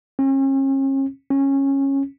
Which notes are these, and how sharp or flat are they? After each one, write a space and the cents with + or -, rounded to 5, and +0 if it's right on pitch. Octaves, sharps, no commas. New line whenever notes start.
C#4 -40
C#4 -15